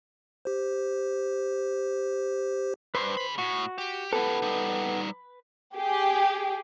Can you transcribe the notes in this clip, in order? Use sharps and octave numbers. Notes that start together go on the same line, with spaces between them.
G4 C5
G2 B4 C5 C6
G#4 B5
A2 F#4
G4
B3 E4 G4 A4 B4
G3 D#4
G4 G#4